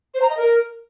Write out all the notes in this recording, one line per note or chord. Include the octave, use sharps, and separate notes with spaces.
C5
A#5
D#5
A#4